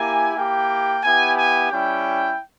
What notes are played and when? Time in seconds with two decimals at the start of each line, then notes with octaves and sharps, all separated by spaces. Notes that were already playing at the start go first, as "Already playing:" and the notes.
Already playing: A#3 E4 G4 G#5
0.36 A#3 E4 G4 G5
1.03 B3 E4 G4 G#5
1.37 G#5
1.71 G3 C#4 E4 G5